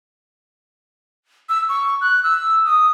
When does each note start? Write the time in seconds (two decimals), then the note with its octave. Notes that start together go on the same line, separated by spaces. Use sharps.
1.49 E6
1.69 C#6
2.01 F#6
2.23 E6
2.65 D#6